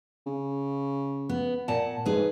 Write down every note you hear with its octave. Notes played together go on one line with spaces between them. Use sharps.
C#3
B3
A#2 F#5 A5
G#2 G#4 B4